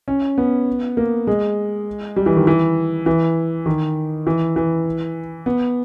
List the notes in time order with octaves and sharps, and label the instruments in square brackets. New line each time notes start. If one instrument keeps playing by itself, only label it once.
[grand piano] C#4
B3
A#3
G#3
G3
E3
D#3
E3
E3
D#3
E3
E3
B3